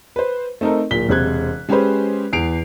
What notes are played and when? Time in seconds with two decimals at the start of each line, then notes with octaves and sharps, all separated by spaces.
0.16 B4 C5
0.61 A3 C4 D#4 A4 A#4
0.91 D1 A#2 A#3 B6 G7
1.09 E1 C3 C5 F#6 G#6
1.69 G#3 C#4 G4 G#4 B4 C5
2.33 E2 C7 D7 F7